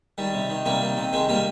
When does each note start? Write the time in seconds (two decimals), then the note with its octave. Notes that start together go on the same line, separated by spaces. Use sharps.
0.18 D#3 G3
0.34 C3
0.50 D#3
0.65 C3 G3 A#3
0.82 D#3
0.97 C3
1.13 D#3 G#3 C4
1.29 C3 G3 A#3